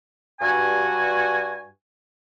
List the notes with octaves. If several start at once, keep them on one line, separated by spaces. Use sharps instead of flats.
G2 F#4 G#5